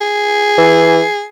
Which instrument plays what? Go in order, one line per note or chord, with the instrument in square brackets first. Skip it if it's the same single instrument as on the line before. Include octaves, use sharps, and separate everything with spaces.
[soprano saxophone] G#4
[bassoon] E3